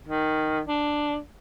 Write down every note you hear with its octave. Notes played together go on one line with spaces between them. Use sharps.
D#3
D4